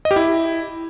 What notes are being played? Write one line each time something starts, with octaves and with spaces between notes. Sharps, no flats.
D#5
G4
E4